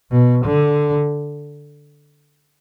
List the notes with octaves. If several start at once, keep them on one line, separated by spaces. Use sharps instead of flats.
B2
D3